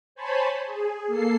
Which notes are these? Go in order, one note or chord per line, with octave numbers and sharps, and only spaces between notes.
C5 C#5 G#5 A5 B5
G#4
A#3 A4 C7